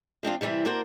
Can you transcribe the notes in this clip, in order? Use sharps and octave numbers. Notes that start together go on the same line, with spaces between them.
F3 C4 D4 F4
C3 E3 G3 C4 E4
A#3 D4 F#4 A#4 C5